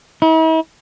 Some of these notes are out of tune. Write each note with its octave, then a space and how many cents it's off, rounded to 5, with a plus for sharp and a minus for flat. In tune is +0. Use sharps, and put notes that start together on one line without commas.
E4 -45